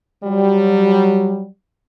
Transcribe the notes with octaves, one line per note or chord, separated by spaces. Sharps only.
F#3 G3